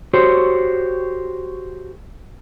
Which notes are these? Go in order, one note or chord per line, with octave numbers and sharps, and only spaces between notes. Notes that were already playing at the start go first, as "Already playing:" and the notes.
F#4 G4 A4 C5 C#5